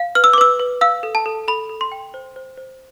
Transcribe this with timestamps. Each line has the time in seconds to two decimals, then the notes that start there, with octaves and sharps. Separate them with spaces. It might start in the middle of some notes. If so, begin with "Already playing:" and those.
Already playing: F5
0.15 B4 F6
0.24 E6
0.33 D6
0.38 B4 E6
0.59 B4
0.81 F5 E6
1.03 A4
1.15 A5
1.26 A4
1.48 A4 B5
1.69 A4
1.81 C6
1.92 G5
2.14 C5
2.36 C5
2.58 C5